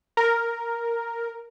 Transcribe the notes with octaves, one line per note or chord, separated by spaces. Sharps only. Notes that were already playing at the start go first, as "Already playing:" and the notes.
A#4